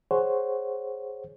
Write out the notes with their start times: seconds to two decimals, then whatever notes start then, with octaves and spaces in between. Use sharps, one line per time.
0.11 G#4 C5 C#5 F#5